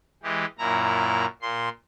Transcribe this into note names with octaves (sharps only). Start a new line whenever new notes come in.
E3 G#3 G4
F#2 A#2 E4 A#5
A#2 C6